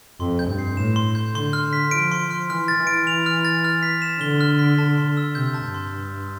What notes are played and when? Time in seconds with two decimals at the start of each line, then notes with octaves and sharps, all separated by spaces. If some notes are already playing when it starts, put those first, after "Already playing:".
0.20 F2 C6
0.39 G6
0.49 G2
0.59 C7
0.77 A2 E7
0.96 C6
1.15 G6
1.34 D3 C6
1.53 F6
1.73 B6
1.91 F3 D7
2.12 C6
2.31 F6
2.49 E3 F6
2.68 A6
2.78 E3
2.87 D7
3.07 F7
3.26 F6
3.45 A6
3.64 F6
3.83 B6
4.02 E7
4.21 D3 G7
4.41 F6
4.59 B6
4.78 A5
4.98 C6
5.17 E6
5.35 C3 G6
5.54 A5
5.64 G2
5.74 C6